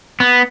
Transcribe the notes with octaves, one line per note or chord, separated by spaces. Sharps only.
B3